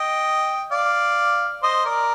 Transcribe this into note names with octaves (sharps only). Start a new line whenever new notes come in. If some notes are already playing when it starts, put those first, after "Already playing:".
Already playing: D#5 G5
D5 F5
C5 D#5
A#4 D5